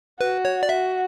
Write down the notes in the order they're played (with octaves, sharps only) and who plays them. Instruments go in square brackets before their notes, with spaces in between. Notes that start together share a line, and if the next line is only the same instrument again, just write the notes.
[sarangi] F#4 [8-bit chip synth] B4
[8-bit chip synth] C#5
D5
[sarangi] F#4 [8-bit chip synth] E5